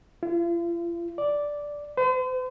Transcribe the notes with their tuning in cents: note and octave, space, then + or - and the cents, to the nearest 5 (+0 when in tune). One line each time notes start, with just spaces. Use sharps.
F4 -40
D5 -5
C5 -45